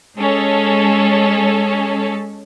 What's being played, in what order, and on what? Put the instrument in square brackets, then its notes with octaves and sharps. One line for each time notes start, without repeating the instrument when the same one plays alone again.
[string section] G#3 C#4 A4